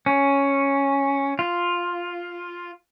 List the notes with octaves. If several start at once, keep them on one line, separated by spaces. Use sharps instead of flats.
C#4
F4